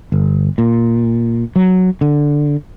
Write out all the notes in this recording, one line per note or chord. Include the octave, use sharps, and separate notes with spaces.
G1
A#2
F#3
D3